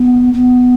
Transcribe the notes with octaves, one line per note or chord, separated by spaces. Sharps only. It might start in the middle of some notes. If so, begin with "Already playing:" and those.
Already playing: B3
B3